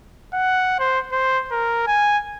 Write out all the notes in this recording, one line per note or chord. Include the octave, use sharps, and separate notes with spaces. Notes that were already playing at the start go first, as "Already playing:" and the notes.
F#5
C5
C5
A#4
G#5